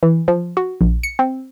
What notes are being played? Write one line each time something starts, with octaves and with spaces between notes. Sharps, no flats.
E3
F3
F#4
A#1
C#7
C4